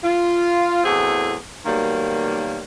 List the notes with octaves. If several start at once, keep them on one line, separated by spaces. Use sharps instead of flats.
F4
E2 A2 A3 C4 F#4 G#4
B2 D#3 F#3 G3 A#3